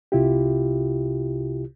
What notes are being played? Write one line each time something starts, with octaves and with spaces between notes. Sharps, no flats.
C2 C3 E4 F4 G4